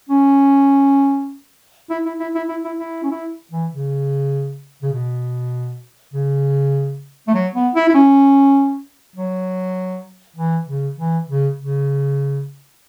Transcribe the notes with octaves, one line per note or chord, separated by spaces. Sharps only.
C#4
E4
E4
E4
E4
E4
E4
E4
C#4
E4
E3
C#3
C#3
B2
C#3
A3
F#3
B3
E4
E4
C#4
F#3
E3
C#3
E3
C#3
C#3